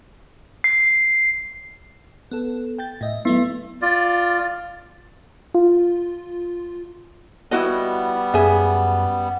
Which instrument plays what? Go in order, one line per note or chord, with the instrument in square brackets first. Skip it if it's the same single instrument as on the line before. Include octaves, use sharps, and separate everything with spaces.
[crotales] C7
[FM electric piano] B3 A4
G5 G6 A6
A2 D#5 E5
[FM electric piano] F#3 A3 E4 [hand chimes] B3
[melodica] F4 D5
[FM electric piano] F4
[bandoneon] G3 B3 [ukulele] E4 F#4 D#5
[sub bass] F#2 [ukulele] G#4 E5